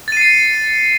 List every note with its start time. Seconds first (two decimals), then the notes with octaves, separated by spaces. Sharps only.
0.08 A6
0.12 D#7
0.17 C7
0.21 C#7